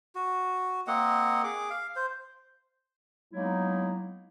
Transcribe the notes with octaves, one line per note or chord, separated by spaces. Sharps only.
F#4
A#3 C4 D#5 F#5
G#4 D6
F5
C5
F#3 G#3 A#3 B3 D#4 E4